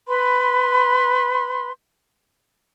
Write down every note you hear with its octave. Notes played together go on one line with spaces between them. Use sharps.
B4 B5 C6